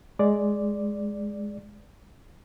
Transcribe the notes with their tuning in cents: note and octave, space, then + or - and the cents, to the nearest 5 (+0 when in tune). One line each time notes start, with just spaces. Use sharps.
G#3 +0 D5 +0